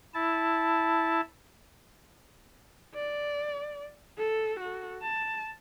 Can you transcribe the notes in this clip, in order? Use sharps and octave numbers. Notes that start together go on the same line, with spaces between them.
E4 A5
D5
A4
F#4 A4
A5